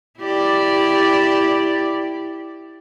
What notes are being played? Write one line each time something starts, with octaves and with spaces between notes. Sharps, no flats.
E4 G4 D5